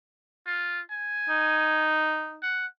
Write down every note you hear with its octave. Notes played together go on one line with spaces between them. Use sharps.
F4
G#5
D#4
F#5